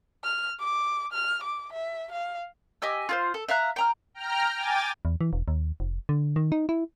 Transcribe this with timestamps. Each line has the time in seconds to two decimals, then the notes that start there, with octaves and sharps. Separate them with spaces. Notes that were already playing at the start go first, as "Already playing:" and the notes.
0.24 F6
0.60 D6
1.13 F6
1.43 D6
1.73 E5
2.12 F5
2.82 G4 D#5 G#5 E6
3.09 F4 G#4 C5
3.34 A4
3.49 E5 F5 A#5 F#6
3.76 G5 A#5 F6
4.14 G5 A#5 F6
4.55 G5 G#5 D6 A6
5.05 E2
5.21 E3
5.33 E1
5.48 D#2
5.80 F1
6.09 D3
6.36 D#3
6.52 D#4
6.69 E4